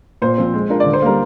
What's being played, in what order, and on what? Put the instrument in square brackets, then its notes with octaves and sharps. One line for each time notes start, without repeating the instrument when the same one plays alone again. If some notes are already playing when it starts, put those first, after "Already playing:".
[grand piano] A#2 [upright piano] C5
[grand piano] F3 C4
G#3
D4 F4 A#4
[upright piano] D5
[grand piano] D3
[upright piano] C5
[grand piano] G3 A#3 [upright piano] A#4